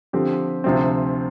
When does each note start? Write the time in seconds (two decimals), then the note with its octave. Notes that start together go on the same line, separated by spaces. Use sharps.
0.13 D3 F3 C4 G4
0.64 D2 C3 F3 C4